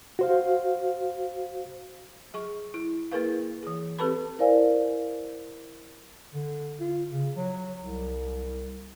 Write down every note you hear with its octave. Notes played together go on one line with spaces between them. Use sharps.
F#4 C5 F5
F#3 G#4 C#6
E4
A#3 E4 G#4 A#4 B4 F5
E3 G#4
C4 G4 A4 B4 A5 B5
E4 A#4 C5 D5 F5 G#5
D3
F4
C#3
F#3
C2